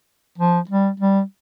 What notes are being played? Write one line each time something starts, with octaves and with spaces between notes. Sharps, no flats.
F3
G3
G3